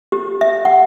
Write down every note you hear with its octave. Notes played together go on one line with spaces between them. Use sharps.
G4
E5
F#5